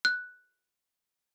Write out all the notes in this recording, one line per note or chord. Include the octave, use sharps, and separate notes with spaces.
F#6